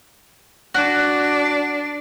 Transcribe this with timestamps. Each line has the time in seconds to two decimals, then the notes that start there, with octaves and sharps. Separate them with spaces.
0.74 D4 F#4